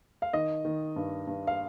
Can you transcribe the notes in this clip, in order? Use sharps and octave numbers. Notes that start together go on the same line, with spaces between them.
F5
D#3 D#5
D#3
G2
G2
F5